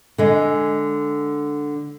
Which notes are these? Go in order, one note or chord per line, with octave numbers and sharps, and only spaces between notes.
D3 G#3